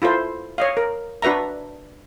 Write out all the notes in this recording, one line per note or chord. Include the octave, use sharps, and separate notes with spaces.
E4 F4 A4 C5
C#5 D#5 F5
A#4
D4 F#4 B4 E5 A#5